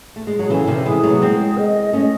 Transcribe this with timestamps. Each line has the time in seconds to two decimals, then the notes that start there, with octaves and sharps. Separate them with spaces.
0.16 A3
0.27 G#3
0.39 F#3 G#4
0.50 C#3 E3 A4
0.67 C3 D#3
0.85 E3 G#3 G#4
1.03 F#3 A3
1.22 G#3 C4 G#4
1.57 D#5
1.93 A3 C#4 D#5